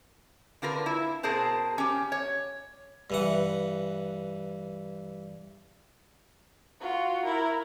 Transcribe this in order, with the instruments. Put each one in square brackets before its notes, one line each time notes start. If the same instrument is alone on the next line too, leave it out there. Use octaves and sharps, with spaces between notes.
[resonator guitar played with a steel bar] D3 F4 A#4 B4
E4
B2 G#4 A#4 C5 A5
C#4 G4
C#5
[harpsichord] G2 E3 F#5
[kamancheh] F4 F#4
E4 A#4